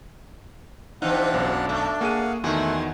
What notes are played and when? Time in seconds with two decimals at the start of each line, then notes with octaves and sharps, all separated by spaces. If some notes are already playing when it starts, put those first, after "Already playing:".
1.02 C3 E3 C4 D4 D#4 F5 F#5 F#6
1.34 B1 F#2
1.69 A3
2.01 A#3 G#4 F5 F#5 D#7
2.44 E2 D#3 A3 F#4 G#5 C6